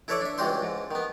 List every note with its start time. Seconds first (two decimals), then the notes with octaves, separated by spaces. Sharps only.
0.08 E4 A4 B4 C#5 D5 E5
0.21 D4 E5
0.38 C#2 E3 G3 F#4 C5 C6
0.62 G#2
0.91 D#3 B3